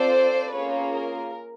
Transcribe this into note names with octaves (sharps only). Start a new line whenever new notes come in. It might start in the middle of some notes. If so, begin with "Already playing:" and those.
Already playing: C4 F4 A4 C5 D5
A#3 C#4 F4 G#4 B4 C#5
A#4